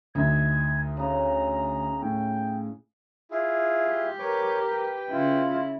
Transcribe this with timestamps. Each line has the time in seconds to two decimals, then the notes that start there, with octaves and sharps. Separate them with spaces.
0.15 D2 D#4 E5 G#6
0.97 C#3 D#5 A#5
2.01 A2 G5
3.31 E4 F4 G#4
3.86 G4
4.19 A#4 B4 C#5 D6
4.70 B4 G5
5.09 C#3 E4 F4